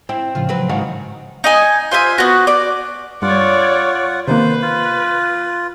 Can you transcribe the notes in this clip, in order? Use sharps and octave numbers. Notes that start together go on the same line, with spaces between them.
E4 C5 G5
A2 C#3 F3 F4
F#3 C4 B4
G#2 D#3 F#4 C#5 F5 F#5
D#4 D#5 G#5
F4 C5 E5 G#5
B3 F#4
D5
G2 F4 C#5 D5 F#5
C3 D#3 A#3 B4 C5
F4